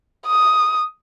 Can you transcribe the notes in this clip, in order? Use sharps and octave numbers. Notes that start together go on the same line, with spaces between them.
D#6